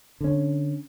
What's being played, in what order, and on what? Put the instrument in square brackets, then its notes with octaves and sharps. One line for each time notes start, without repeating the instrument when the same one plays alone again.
[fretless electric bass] D3 C#4